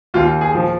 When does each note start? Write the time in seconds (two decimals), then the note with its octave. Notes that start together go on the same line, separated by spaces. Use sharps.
0.14 D#2 F4
0.41 G#4
0.55 F3